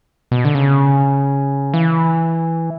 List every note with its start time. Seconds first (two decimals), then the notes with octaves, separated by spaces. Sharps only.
0.31 B2
0.45 D3
0.55 C#3
1.74 E3